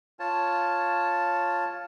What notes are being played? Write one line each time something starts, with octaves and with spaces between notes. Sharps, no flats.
F4 C#5 A5